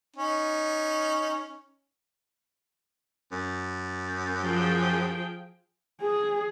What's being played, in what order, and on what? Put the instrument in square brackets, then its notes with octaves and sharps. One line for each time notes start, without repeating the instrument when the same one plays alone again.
[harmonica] C#4 D#4
[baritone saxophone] F#2
[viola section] F3 G#4 G5
[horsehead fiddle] G#4